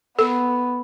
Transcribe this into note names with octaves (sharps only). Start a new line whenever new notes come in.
B3 A4